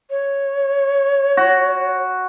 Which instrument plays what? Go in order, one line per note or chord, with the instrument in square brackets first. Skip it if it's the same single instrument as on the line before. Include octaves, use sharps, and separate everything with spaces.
[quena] C#5
[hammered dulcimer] F#4